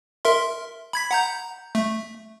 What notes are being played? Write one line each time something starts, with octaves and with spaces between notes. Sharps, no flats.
A#4 E5 C6
B5 G#6 B6
F#5 A#5 G6
A3